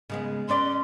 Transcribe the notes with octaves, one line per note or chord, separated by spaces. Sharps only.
C#3 G#3 B3
C#4 B4 D5 C6